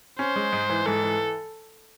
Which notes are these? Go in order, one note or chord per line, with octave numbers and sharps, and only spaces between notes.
C#4 C5
G#3
G#2
E3
G#2 A4
E3